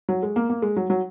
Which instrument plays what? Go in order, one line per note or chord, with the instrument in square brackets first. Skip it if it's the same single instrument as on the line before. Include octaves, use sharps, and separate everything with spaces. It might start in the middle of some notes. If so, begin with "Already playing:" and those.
[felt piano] F#3
G#3
A#3
A#3
G#3
F#3
F#3